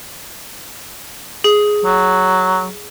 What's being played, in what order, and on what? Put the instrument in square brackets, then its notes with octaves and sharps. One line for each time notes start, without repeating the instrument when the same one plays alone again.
[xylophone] G#4
[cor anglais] F#3